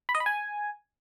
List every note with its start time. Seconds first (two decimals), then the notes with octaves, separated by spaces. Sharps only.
0.09 B5
0.15 D#5
0.20 B5
0.26 G#5